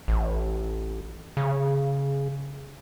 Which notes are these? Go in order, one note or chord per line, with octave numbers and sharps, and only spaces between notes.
A1
C#3